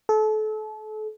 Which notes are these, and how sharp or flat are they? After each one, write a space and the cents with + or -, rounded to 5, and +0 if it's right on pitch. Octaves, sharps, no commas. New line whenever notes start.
A4 -35